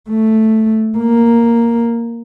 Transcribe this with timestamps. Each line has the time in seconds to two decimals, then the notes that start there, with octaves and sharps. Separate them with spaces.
0.10 A3
0.98 A#3